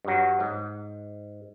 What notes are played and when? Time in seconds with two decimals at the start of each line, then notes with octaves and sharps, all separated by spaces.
0.05 G2 F#3
0.40 G#2